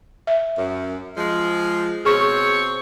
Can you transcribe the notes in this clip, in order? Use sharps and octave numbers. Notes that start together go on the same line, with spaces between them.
E5
F#2
F3 G#3
B2 C4 G#4 C#5 C#6